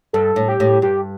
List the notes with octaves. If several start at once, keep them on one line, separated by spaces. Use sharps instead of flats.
G2 A4
A2
G4
A2
G2 G4